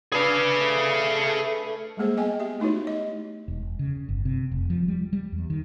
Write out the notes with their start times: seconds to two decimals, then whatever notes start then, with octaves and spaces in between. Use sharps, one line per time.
0.12 D4 G#4 B4 F5 E6
0.59 A3
1.97 G3 G#3 A#3 G#4 C5
2.17 A#3 B3 D#5 G5 G#5
2.40 G4 E5
2.60 A3 D#4 E4 F#4 C#5
2.87 D#5
3.48 E1
3.79 C#3
4.09 G1
4.25 C3
4.52 F1
4.70 F3
4.88 G3
5.13 G3
5.32 E2
5.50 D#3